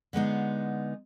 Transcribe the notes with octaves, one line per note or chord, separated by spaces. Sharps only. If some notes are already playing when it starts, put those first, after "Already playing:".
D3 G#3 B3 D#4